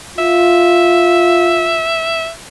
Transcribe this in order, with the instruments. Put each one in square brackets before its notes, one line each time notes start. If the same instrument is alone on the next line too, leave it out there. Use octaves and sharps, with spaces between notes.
[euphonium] F4 [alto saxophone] E5